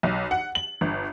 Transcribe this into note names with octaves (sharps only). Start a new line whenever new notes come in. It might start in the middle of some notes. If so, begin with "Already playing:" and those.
B1
F#5
F#7
G1